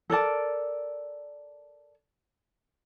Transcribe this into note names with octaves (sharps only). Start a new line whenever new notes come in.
A4 A#4 D5 A5